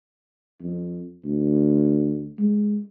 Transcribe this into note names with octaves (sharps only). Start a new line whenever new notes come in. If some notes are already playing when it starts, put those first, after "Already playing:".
F2
D2
G#3